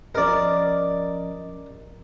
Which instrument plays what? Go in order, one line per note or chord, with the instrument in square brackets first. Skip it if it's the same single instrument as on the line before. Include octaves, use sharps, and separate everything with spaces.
[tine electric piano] F3 C#4 D#5 [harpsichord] A#4 D5